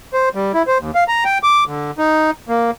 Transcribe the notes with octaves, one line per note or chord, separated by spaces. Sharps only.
C5
G3
E4
C5
D#2
F5
A#5
G5
D6
D3
D#4
A#3